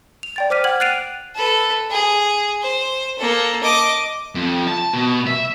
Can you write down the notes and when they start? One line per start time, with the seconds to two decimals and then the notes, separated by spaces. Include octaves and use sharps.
0.23 F7
0.36 D5 G5 A6
0.50 C5 D6 F6 B6 D#7
0.64 F#5 G5 F6 G#6 F#7
0.80 F#6 A6 C7 D7 D#7 F7
1.35 A4 B4
1.90 G#4
2.62 C5
3.18 A#3 A4
3.63 D#5 D6
4.35 F2
4.67 A5
4.93 B2
5.27 E5